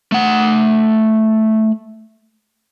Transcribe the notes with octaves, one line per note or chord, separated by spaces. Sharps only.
A3 F#5